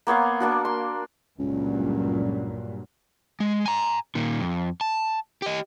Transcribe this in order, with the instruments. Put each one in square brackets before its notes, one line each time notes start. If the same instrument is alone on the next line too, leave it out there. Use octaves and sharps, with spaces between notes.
[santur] A#3 B3 C#5 F5
A#3 D4 F#4
C6
[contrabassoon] C#2 [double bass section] G2 A#2 F#3
[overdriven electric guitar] G#3
G#5 A#5
A#2 D#3
F2
A5
G4 D#5